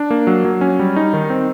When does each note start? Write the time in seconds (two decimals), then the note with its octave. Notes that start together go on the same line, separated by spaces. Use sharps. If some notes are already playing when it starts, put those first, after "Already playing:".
Already playing: D4
0.10 A#3
0.27 F#3
0.44 F#3
0.61 C#4
0.79 G3
0.96 D#4
1.13 D#3
1.30 C4